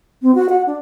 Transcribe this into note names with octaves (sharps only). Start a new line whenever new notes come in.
C4
F#4
F#5
D4